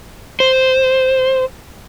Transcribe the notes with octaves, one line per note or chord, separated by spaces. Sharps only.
C5